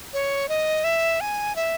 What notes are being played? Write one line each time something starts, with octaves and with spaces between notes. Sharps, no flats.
C#5
D#5
E5
G#5
E5